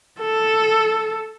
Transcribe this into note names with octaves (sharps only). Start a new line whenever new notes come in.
A4